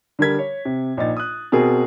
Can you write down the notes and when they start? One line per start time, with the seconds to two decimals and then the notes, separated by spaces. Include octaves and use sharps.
0.19 D3 G3 A#4 G#6 B6
0.39 C#5
0.65 C3
0.97 A#1 D#4 A6
1.17 D#6 F#6
1.52 B2 C4 G#4 A#4